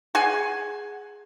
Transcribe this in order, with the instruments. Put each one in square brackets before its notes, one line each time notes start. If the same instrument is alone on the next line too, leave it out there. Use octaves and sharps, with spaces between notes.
[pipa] G#4 F#5 G#5